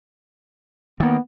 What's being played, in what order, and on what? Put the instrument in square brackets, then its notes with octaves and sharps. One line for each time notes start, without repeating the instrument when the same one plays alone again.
[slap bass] D#3 A#3 [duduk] B3